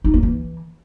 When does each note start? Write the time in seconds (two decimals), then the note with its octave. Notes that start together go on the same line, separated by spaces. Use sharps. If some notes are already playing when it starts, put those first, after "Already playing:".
0.04 D#4
0.14 A#3
0.23 E3